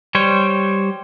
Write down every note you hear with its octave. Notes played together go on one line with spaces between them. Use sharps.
G3 C5 C#5